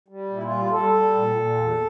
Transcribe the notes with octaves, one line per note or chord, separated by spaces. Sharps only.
G3
A#2 E4
F4
G3
G3 A4
G3
A#2
A#2
E2